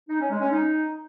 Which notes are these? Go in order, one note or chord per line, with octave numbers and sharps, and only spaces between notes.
D#4
C#4
G#3
C#4
D#4